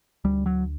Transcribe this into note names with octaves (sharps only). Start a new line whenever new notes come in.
D2 G3
F#3